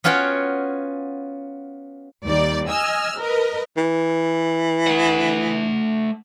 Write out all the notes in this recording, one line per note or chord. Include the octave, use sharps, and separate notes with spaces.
B3 C#4 F4 F#4 C#5 G5
D#2 G3 D#4 D5
D#5 G#5 E6 F6
A#4 B4 D#5
E3
A3 F#5